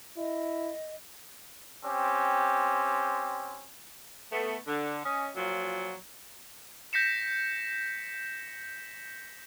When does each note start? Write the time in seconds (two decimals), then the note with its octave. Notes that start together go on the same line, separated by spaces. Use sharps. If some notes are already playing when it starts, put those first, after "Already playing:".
0.17 E4 D#5
1.84 C4 C#4 G4
4.32 A3 B3
4.67 D3
5.05 C#4 D#5
5.36 A#2 F3 F#3
6.93 G6 A#6 B6 C#7 E7